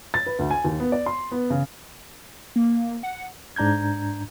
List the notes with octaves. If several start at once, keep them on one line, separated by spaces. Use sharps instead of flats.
A6
B4
D2
G#5
D#2
B3
D5
C6
B3
C#3
A#3
F#5
G#2 D4 A#5 G6 G#6